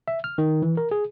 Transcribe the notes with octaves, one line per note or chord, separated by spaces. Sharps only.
E5
F6
D#3
E3
A#4
G#4